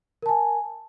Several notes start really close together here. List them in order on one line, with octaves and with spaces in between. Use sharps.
A#4 A5 G#5